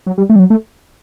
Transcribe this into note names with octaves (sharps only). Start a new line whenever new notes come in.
F#3
G3
A3
G3
F#3
A3